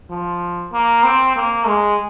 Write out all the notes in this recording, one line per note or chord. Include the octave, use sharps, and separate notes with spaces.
F3
A#3
C4
A#3
G#3